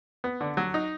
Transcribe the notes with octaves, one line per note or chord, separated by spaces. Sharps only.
B3
D3
F#3
D#4